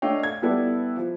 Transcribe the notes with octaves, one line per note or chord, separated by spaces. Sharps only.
A3 D4 C#5 D#5 F5 G5
G#6
G3 B3 E4 A4 B4 D5
F3